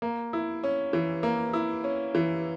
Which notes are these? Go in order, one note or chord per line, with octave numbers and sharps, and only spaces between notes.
A#3
E4
C#4
E3
A#3
E4
C#4
E3